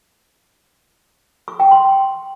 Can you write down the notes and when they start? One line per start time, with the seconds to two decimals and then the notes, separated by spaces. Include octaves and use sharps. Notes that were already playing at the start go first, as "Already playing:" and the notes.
1.48 C#6
1.60 G5
1.71 C6